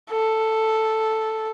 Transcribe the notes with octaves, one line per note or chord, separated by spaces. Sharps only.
A4